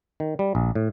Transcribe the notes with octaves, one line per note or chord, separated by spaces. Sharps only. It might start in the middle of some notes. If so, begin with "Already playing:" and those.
D#3
G3
A#1
A2